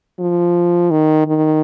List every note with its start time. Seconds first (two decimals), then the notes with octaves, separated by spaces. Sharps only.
0.19 F3
0.91 D#3
1.26 D#3